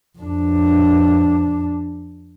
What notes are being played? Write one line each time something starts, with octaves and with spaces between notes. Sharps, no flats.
F2 D4